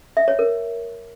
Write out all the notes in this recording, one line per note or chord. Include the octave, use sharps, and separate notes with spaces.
E5
C#5
A#4